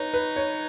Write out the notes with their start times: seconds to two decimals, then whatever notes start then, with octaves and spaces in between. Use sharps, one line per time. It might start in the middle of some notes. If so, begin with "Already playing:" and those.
Already playing: D#4 B4 C#5
0.14 B4
0.36 C#5